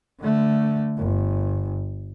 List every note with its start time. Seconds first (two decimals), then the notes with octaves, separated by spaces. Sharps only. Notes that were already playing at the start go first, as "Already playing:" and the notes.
0.20 D3 A3
0.98 G1